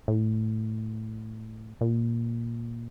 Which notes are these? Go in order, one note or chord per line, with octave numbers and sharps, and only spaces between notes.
A2
A#2